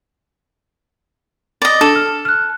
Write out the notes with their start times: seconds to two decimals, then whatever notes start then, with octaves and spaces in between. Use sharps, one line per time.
1.62 D5 D#5
1.81 D4 A4
1.96 F6
2.25 F6 F#6